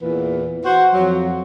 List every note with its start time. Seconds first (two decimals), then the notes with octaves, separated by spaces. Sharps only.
0.02 E2 A#2 E3 B4
0.65 F#4 C5
0.94 F2 F#3